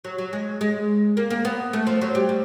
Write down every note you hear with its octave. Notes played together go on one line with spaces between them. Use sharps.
F#3
F#3
G#3
G#3
A#3
A#3
B3
A3
F3
F#3
G3
G3